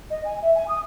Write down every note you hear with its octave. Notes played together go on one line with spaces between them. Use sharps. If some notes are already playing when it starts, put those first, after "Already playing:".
D#5
G#5
E5
G#5
D#6